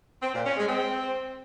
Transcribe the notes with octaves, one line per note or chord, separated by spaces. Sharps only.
C4
A#2
C#4
G#3
C4